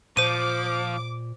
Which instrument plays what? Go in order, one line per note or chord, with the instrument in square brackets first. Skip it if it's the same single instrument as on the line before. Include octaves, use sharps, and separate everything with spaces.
[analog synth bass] A#2 [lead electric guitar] F3 [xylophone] C5 D#7 [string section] D6